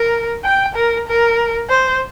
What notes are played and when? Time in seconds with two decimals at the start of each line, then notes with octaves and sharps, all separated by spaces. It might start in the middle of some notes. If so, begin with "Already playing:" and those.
Already playing: A#4
0.44 G5
0.75 A#4
1.08 A#4
1.70 C5